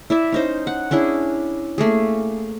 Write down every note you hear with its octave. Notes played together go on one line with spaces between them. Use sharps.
E4 D5 E5
C#4 D#4 C5
F#5
C#4 D4 E4 G#4
A3 A#3 G#4